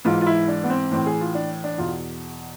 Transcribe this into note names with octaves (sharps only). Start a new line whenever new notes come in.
G#2 E3 F4
F4
E4
D4
B3
C4
A2 E3 C4
G#4
F4
D4
D4
E2 B2 F4